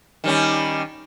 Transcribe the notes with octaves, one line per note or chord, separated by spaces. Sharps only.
D#3 G3 C#4